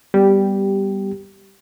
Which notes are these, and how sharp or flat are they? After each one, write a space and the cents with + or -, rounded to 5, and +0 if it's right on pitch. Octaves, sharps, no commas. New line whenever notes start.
G3 +0 B3 +0 G4 -10